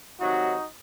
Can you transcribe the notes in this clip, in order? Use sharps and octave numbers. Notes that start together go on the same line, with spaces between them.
C3 D#3 F#3 D#4 F#4